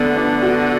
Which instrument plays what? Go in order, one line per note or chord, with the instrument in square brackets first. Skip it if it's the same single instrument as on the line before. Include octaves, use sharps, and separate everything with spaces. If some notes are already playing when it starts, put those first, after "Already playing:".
Already playing: [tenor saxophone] D3 [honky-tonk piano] A3 B3
[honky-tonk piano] D4
F#4